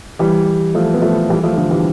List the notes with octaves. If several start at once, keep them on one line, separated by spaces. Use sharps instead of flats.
E3 G3
F3 A3
B3
F3 A3
E3 G3
F3 A3
D3 F3
E3 G3